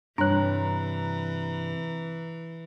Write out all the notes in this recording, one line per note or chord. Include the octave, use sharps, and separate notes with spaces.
G2 C3 E3 D4 C#5 A#5 F#6